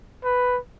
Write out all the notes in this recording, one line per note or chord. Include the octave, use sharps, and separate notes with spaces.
B4